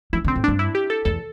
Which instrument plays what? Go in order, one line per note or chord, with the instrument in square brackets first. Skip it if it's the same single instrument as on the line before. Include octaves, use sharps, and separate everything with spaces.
[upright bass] E3 [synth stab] E4
[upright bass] D3
[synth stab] C4
[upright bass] A2
[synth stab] D4
[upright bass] G2
[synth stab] E4
G4
A4
[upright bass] E2 [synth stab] A4